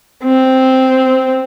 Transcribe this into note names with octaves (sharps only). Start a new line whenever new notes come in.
C4